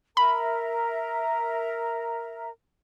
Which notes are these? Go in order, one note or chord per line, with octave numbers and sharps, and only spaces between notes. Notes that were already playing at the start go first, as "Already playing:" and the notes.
A#4 E5 A#5 B5